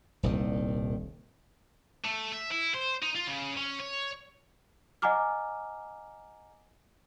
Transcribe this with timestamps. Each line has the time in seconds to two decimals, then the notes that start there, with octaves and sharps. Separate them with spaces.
0.23 D#1 C2 D#3
2.05 A3
2.32 E5
2.52 E4
2.74 C5
3.02 D#4
3.15 F4
3.27 C#3
3.57 C#4
3.80 C#5
5.02 D#5 F#5 G#5 A#5 D6 F6